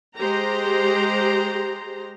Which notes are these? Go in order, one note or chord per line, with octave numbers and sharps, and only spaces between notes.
G#3 G4 C5 A#5